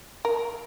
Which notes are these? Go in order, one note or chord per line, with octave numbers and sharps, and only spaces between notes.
A#4